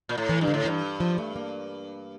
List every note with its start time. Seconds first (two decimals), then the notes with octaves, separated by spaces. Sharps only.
0.09 A#2
0.18 A2
0.29 E3
0.41 G2
0.48 D3
0.54 A2
0.65 G2 E3
1.00 F3
1.18 A3
1.36 A#3